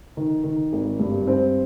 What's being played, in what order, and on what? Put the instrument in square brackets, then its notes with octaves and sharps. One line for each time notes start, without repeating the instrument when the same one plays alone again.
[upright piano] D#3
D#3
G#1
G2
C4